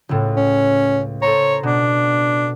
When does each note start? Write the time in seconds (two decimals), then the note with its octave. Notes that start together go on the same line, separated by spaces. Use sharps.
0.09 C#2 A2
0.36 C#4
1.22 A4 C5 C#5 A#5
1.63 B2 D4